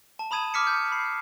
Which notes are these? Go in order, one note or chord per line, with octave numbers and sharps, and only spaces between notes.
A5
A#5 B5 D#6 G#6 D#7 E7
D6 F6 B6 C#7
G6
B5 C7